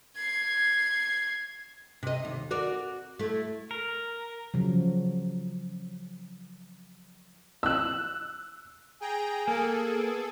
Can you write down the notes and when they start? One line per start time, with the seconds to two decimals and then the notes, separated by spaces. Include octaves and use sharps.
0.16 G#6 C7
2.03 C3 D#5
2.25 D#2
2.51 F#4 A#4 D5
3.19 A3 E4
3.71 A#4
4.54 C#3 F3 F#3
7.63 E6 F#6
9.01 G#4 G5 G#5 A#5
9.48 A#3 G#4 A4
9.92 B3